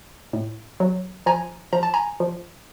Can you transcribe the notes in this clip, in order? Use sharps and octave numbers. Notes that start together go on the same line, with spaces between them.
A2
F#3
F3 G#5 A#5
F3 A#5
A5
G#5 A#5
F3